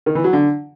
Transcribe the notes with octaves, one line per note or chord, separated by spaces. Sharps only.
D#3
E3
F#3
D3